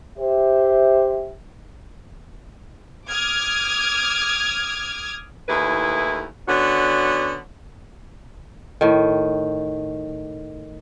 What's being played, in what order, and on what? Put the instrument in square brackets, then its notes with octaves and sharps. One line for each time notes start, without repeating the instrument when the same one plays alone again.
[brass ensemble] G4 C5 E5
[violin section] D6 D#6 F6 G#6
[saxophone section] D#2 A2 E4 G#4 B4
D3 B3 C#4 F#4 D5
[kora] A2 D#3